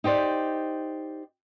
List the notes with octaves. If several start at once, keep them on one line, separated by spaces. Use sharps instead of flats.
D#4 G4 C5 D5